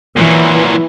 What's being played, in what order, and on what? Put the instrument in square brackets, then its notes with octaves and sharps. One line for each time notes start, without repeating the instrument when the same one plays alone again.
[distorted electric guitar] A#2 F#3 [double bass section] E3